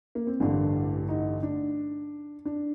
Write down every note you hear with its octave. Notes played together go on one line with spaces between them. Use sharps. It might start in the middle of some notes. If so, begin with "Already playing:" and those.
A#3
C4
A1 G2 D3 D4
D#4
D4
D4